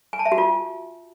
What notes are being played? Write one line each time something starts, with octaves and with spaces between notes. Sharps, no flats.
G#5
A5
E5
F#4
F4